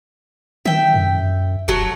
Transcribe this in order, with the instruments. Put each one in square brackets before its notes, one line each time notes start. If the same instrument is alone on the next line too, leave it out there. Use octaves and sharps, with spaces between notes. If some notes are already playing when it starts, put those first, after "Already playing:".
[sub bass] D#3 [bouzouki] E5 G5
[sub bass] F#2
[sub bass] E1 [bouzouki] F#3 A3